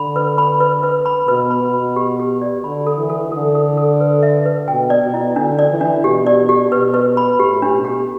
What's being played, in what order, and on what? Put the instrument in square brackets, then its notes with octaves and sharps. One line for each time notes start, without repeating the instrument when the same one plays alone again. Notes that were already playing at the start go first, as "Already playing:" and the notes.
Already playing: [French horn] D3 [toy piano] B5
[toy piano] B4
B5
B4
B4
B5
[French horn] B2 [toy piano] B4
[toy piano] B5
[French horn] B2
[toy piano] B5
G4
G4
D5
[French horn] D3 [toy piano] B5
[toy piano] A4
[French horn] E3
[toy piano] A4
[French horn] D3 [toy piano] A4
[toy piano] A4
A4
B4
E5
B4
[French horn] B2 [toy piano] G5
[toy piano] D5
[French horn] B2
[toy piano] E4
[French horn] D3 [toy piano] D4
[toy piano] D5
[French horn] E3
[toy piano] D4
[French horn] B2 [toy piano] G4
[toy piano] D5
G4
[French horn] B2 [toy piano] B4
[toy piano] B4
B5
[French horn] A2 [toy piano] G4
[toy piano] D4
[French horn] B2
[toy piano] G4